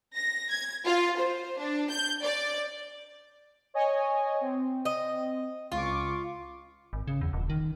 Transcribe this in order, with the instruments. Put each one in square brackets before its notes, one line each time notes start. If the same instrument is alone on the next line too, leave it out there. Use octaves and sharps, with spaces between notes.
[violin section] A#6
G#6
F4
C5
D4
G6
D5
[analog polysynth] C#5 D#5 G#5
C4
[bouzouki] D#5
[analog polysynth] C#2 C#6 D6 [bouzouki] F4
[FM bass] G#1
C#3
E2
D#1
D#3